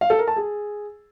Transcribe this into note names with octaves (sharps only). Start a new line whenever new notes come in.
F5
A4
A#4
A5
G#4